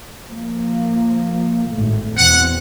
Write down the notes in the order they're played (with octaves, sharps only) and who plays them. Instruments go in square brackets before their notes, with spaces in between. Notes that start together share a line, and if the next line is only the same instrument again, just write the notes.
[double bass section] F3 A#3
G#1 A2 A3
[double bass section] E2 B2 C4 [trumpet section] F#5